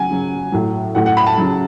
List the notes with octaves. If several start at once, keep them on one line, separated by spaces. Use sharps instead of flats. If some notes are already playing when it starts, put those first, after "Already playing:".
Already playing: C#3 F#3 F#5 G#5
C#3 F#3
A2 F#3
A2 F#3 F#5
F#5
B5
A5
C#3 F#3 A5